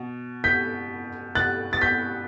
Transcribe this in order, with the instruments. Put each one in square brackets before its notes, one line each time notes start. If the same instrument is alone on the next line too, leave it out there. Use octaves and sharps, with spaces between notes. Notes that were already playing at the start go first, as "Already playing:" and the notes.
Already playing: [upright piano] B2
G6 B6
F#6 A6
A6
G6 B6